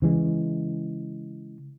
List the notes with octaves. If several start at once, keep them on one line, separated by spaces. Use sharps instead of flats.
C#3 E3 G#3